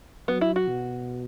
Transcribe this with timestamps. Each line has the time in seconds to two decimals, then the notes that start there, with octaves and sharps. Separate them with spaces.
0.28 F#3 B3
0.41 E4
0.56 F#4
0.68 B2